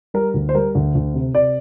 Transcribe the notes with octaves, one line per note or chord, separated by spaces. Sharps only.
G3 A#4
D2
C5
G3 A#4
D2
D2
C3
C3 D5